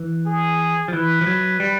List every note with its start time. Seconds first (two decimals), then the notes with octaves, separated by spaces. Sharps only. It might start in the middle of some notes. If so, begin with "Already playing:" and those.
Already playing: E3
0.26 G#4
0.88 F3
0.93 E3 B4
1.21 F3
1.27 F#3
1.60 G3